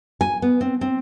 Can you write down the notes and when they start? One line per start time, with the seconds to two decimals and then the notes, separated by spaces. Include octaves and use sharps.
0.21 G#5
0.42 B3
0.61 C4
0.81 C4